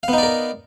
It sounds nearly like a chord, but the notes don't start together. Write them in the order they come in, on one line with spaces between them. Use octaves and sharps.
F5 B3 D#4 D5 A#4